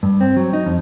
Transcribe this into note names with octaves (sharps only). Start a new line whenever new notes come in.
G2
C4
F#3
D#4
F2